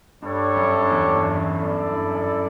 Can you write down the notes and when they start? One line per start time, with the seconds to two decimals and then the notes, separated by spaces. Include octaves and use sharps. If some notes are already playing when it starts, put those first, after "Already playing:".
0.22 G2 G3 D4 A4 C#5
0.56 F#2
0.90 E2
1.07 G2
1.15 E2
1.24 F#2
1.58 E4 A4 D5
1.92 G2
2.09 F#2